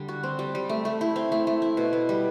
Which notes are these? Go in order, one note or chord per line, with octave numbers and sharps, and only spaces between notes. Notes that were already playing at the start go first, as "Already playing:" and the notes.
Already playing: D3 G3
F#4
C4
G3
G3
A3
A3
E4
C4
A3
A3
E4
B2
B3
G3